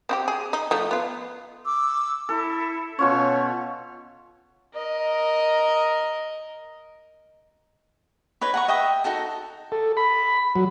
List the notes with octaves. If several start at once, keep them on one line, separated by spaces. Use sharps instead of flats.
C4 F#4 G4
G#4
D#4
F3 A3 D#4
B3 F4
D6 E6
E4 A4
B2 C#4 F4 C#5
A#4 D#5
D#4 B4 C#5
F#5 A#5 C#6
D#5 E5 G5 D#6
D#4 F#4 A4 A5
A4
B5
F#3